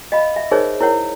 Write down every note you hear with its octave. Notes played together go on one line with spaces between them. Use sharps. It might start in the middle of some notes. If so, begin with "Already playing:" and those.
D#5 F5 B5
E5
D#4 G#4 A#4 C5 C#5
E4 A#4 C#5 F#5